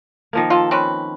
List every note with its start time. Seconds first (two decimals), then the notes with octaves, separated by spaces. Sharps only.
0.33 D#3 F3 A#3
0.50 F4 A4
0.71 C4 C#4 B4